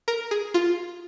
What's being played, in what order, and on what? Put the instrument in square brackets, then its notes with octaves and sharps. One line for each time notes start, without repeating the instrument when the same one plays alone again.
[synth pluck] A#4
G#4
F4